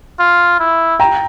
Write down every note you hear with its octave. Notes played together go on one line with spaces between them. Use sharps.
F4
E4
G5 A#5